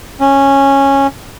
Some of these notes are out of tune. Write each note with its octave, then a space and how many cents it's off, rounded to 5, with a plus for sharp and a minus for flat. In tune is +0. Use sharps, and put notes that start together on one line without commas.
C#4 -10